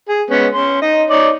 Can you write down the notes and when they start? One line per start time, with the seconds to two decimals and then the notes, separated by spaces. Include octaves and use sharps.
0.09 G#4
0.30 G#3 B3 C#4
0.53 C#4 C6
0.82 D#4 D#5
1.10 D#4 C#5 D5